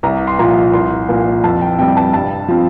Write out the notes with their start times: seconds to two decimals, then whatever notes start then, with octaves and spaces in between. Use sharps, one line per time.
0.03 C2 A#5
0.27 C6
0.39 A#2 F3 A#5
0.73 C2 C6
1.09 A#2 F3 A#3
1.44 F2 A5
1.62 G5
1.79 C3 G3 G5
1.97 A5
2.13 G2 A5
2.48 F3 C4